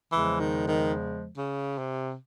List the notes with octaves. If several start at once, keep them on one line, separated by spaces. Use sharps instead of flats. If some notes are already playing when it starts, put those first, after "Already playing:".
E2 C#3 E3 F3 G#3
D#3
D#3
C#3
C3